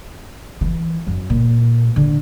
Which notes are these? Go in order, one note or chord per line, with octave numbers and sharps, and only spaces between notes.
E3
F#2
A#2
D3